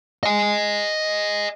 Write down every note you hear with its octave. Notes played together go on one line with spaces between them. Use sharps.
D#5 G#5